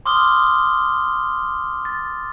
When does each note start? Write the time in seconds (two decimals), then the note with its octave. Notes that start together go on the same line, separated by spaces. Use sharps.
0.06 C6 D6 D#6 F6 G7
1.85 A6